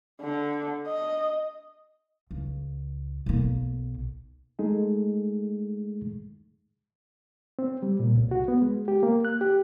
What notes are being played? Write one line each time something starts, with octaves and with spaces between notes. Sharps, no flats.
D3
D#5
C#2
B1 A#3
G#3 A3 D#4 G#4 A4
C4
G3
A#2
C2
F#4
B3
G#3
G4
A#3
F#6
G4